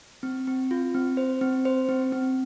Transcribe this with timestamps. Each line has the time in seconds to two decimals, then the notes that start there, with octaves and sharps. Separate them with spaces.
0.23 C4
0.47 C4
0.71 F4
0.94 C4
1.17 C5
1.41 C4
1.65 C5
1.89 C4
2.12 C4